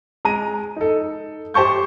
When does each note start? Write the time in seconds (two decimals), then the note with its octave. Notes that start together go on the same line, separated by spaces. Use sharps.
0.25 G#3 A#5 D#7
0.76 D#4 A4
1.54 G4 C5 A5 C#6 G6